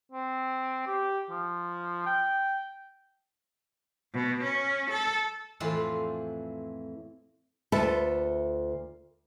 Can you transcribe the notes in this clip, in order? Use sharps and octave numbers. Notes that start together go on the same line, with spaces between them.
C4
G4
F3
G5
B2
C#4
A4
F2 A2 E3 C4 F4 F5
D2 F4 A4 B4 E5 A5